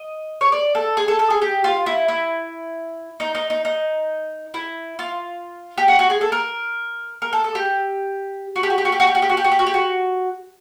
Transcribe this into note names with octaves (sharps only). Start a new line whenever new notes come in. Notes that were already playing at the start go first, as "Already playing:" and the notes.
Already playing: D#5
C#5
D5
A4
G#4
A4
A4
G#4
G4
F4
E4
E4
D#4
D#4
D#4
D#4
E4
F4
G4
F#4
F#4
G#4
A4
A#4
A#4
A4
A4
G4
F#4
G4
F#4
G4
F#4
G4
F#4
G4
F#4
G4
F#4
G4
F#4
G4
F#4
G4
F#4